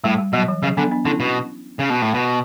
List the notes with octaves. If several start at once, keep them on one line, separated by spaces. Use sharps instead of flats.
A2 G3
G3
B2 F#3
E3
C#3 F#3
D3 B3 D4
B3 D4
D3 C#4 E4
B2
C#3
B2
A2
B2